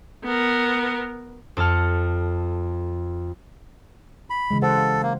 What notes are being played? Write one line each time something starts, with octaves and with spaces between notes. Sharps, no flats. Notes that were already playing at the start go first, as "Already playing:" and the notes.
B3 A#4
F2 A4 A5 F6 C#7
B5
C#3 E3 G#3
G4 A4 C5 F#5
F5
A#3